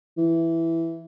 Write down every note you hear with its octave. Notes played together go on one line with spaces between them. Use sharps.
E3